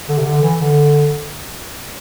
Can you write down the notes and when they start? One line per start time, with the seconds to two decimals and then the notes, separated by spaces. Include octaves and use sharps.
0.09 D3
0.18 C3
0.26 D3
0.42 E3
0.59 D3